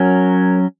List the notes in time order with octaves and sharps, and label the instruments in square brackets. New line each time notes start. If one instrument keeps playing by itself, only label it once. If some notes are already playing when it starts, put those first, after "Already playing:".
Already playing: [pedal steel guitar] F#3 C#4 A#4